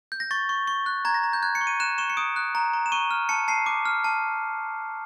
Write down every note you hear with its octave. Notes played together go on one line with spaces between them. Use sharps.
G6
A#6
C#6 A6
C#6
C#6
F#6
A#5 G#6
A#6
A#5
G6
F#6 G#6
C#7
C#6
D#7
F#6 E7
C#6 E7
C#7
D#6 D7
F#6
A#5
A#5
E7
C#6 D#7
F6
A5 C#7
A5 C7
D6
F6
A5